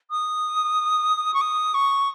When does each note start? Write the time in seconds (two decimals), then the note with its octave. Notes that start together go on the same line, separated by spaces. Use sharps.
0.11 D#6
1.34 C#6
1.41 D#6
1.74 C#6